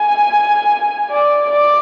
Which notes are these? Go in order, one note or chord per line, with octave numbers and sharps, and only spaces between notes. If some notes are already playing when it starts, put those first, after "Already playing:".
Already playing: G#5
D5
D5